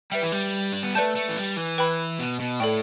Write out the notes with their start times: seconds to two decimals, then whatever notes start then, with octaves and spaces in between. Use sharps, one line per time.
0.11 G3 B4 E5 G5
0.22 E3
0.32 G3
0.72 D4
0.83 B3
0.95 A3 B4 D5 A5 G6
1.15 A3
1.29 E3
1.37 G3
1.56 E3
1.78 B4 G5 B5
2.19 B2
2.40 B2
2.60 A2 A4 D5 G5